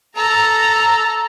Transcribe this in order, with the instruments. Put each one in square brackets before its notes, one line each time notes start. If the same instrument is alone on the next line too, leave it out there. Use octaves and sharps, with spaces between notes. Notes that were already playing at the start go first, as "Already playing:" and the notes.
[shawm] A4 [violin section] A#5